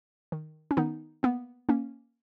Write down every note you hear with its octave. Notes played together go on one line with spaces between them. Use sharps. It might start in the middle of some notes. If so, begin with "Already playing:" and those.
D#3
C#4
D#3 B3 D#4
A#3 B3
A#3 C#4